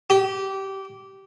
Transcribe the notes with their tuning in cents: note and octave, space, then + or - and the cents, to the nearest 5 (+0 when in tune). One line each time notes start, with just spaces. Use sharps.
G4 -20